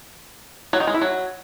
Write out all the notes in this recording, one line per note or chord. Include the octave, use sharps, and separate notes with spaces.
F#3
D#3
G#3
E4
F#3